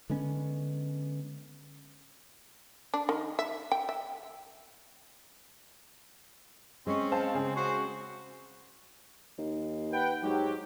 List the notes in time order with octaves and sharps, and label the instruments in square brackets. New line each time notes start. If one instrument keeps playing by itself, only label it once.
[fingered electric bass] D3 G#3 B3 C#4
[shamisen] D4
D#3
E5
G5
E5
[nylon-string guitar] G#3 [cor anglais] C4 [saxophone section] C#4
[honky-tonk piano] C5 F5 A5
C#3 G#4
[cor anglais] F#4 [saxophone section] C5
[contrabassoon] D#2
[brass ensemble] B4 F#5 G5
[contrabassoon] G#2 [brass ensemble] F#3 G4